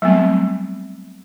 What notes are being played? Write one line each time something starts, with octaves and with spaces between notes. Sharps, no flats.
F#3 G3 A3 B3 C4